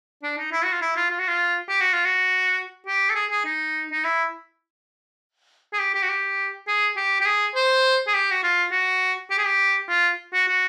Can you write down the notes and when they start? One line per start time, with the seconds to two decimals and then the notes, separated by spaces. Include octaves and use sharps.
0.23 D4
0.38 D#4
0.52 E4
0.64 F#4
0.73 F4
0.82 E4
0.96 F4
1.10 F4
1.19 F#4
1.28 F4
1.69 G4
1.81 F#4
1.93 F4
2.05 F#4
2.86 G4
3.10 A4
3.15 G#4
3.31 G#4
3.45 D#4
3.92 D#4
4.04 E4
5.73 G#4
5.79 G4
5.95 G4
6.03 F#4
6.09 G4
6.68 G#4
6.97 G4
7.21 G4
7.26 G#4
7.55 C5
8.07 G#4
8.14 G4
8.31 F#4
8.43 F4
8.72 F#4
9.31 G4
9.38 G#4
9.45 G4
9.89 F4
10.34 F#4
10.48 F#4